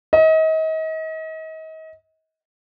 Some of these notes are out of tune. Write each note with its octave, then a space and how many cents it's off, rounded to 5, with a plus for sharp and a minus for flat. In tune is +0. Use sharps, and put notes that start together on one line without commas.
D#5 +35